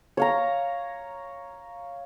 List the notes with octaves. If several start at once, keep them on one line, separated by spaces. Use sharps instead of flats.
C#5 F5 A#5